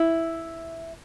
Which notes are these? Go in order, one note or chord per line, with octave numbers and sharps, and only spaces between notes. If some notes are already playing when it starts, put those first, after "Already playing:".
Already playing: E4